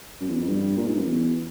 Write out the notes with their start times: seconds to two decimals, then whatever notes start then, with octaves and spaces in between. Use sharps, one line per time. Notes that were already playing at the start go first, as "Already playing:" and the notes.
0.20 F#2
0.30 E2
0.39 F2
0.48 G2
0.77 A#2
0.87 G#2
0.96 F#2
1.05 E2